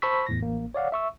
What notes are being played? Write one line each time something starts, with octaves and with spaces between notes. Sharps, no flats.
C5 A5 B5 C#6 E6 B6
E2 A2 A#6
A1 A#3
C#5 D5 F5 F#5
E5 C#6 E6